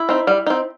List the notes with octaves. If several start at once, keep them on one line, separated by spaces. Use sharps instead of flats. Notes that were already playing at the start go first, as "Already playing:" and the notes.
Already playing: E4
C4 D#4
G3
C4 D#4